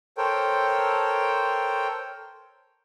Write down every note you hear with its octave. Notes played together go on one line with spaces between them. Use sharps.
A4 A#4 C5 C#5 G5